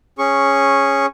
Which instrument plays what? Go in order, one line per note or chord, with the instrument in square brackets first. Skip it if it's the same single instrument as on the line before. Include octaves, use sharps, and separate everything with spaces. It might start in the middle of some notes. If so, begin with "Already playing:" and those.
[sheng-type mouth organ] C#4 G#4 C#6